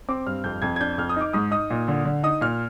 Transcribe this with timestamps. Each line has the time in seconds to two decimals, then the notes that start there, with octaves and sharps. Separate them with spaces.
0.09 C4 D6
0.26 G2 F6
0.44 F2 G6
0.62 F2 G#6
0.76 G#6
0.80 D4 G6
0.98 F2 F6
1.09 D#6
1.16 D#4 D6
1.33 G#2 D#6
1.51 D#4 D#6
1.70 A#2
1.88 D3
2.05 D3
2.23 D#4 D#6
2.41 A#2 F6